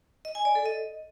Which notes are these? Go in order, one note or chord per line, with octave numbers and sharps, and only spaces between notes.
D#5
G#5
D5
A4
D#5